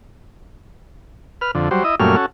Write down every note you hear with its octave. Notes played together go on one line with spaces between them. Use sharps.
B4 F6
F2 D3
F#3 G3 C5
E4 D#5
F#2 A#2 G3 A3 C#4 F6
C#4 F#4 A4